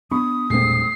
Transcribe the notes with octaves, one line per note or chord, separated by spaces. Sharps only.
B3 D4 B5 C#6 D#6
E1 G2 A#2 G#3 A3 C4 C7